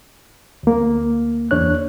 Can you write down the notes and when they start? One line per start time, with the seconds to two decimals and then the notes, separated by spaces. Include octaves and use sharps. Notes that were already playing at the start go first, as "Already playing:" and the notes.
0.63 D2 A#3
1.51 E2 D4 C#5 F#6